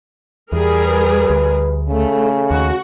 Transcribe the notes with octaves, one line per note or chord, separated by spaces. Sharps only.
E2 G3 G#4 A#4
B4
D2
C#3 A3
D#2 F#4